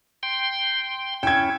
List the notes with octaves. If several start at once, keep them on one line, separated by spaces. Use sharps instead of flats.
G5 C6
C#4 E4 G5 G#6